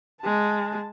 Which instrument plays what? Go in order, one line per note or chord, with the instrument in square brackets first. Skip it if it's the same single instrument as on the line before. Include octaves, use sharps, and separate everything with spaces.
[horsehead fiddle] G#3 A5